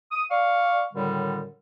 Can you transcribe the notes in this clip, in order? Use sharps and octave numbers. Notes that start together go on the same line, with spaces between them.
D#6
D5 F5 C#6
F#2 A2 D3 D#3 G3